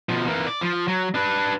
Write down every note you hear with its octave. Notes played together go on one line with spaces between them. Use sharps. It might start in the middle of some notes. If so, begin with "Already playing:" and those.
B2 F3
E3 A#3
D5
F3
F#3
D4 B4